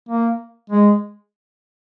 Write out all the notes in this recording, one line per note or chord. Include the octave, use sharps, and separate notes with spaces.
A#3
G#3